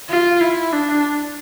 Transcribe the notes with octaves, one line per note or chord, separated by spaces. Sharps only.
F4
E4
D4